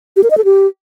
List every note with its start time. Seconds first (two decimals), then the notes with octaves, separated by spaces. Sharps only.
0.16 G4
0.23 A#4
0.30 D#5
0.38 A4
0.45 G4